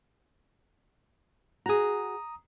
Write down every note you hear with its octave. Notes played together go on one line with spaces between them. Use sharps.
F#4 G#4 A#5 D#6